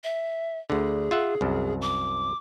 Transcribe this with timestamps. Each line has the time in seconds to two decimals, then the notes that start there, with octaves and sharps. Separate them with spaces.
0.04 E5
0.70 D2 D3 G#4
1.11 F4 E5 F#5
1.41 C2 F#2
1.82 D6